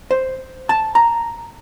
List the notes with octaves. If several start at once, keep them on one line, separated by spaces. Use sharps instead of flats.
C5
A5
A#5